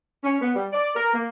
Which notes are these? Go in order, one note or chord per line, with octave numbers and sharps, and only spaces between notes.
C#4
B3
G3
D5
A#4
A#3